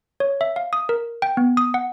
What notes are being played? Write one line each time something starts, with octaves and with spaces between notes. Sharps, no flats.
C#5
E5
F5
D#6
A#4
G5
B3
D#6
F#5